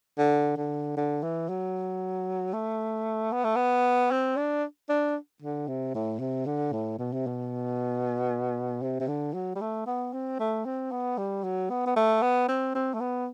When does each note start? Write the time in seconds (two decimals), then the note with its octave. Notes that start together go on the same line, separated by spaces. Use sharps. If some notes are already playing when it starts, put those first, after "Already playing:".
0.19 D3
0.57 D3
0.97 D3
1.23 E3
1.49 F#3
2.53 A3
3.32 B3
3.44 A3
3.56 B3
4.11 C4
4.37 D4
4.89 D4
5.42 D3
5.68 C3
5.94 A2
6.20 C3
6.46 D3
6.72 A2
6.98 B2
7.13 C3
7.27 B2
8.82 C3
9.00 C3
9.08 D3
9.34 F#3
9.55 G3
9.61 A3
9.87 B3
10.13 C4
10.39 A3
10.65 C4
10.91 B3
11.18 G3
11.44 F#3
11.70 B3
11.86 B3
11.96 A3
12.22 B3
12.49 C4
12.75 C4
12.94 A3
13.00 B3